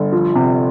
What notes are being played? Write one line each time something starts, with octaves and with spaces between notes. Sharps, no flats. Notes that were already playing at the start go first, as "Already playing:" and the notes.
Already playing: G1
F3
C3